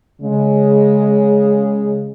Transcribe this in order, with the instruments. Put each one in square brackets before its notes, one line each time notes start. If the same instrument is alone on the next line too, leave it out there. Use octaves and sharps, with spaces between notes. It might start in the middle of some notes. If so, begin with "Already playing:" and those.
[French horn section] C#3 G#3